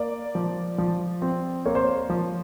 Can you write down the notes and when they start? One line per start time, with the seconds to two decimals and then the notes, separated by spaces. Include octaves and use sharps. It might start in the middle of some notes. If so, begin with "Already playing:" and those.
Already playing: A#3 D5
0.35 F3
0.78 F3
1.22 C4
1.66 A#3 C#5
1.75 C5
1.84 C#5
2.10 F3